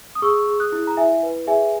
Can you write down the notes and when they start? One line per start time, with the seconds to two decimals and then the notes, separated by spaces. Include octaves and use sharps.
0.15 D#6
0.22 G#4 C#6 E6
0.47 G#4
0.60 D#6 F#6
0.72 E4
0.87 A#5
0.97 E4 E5 G#5
1.23 B4
1.47 G#4 E5 G#5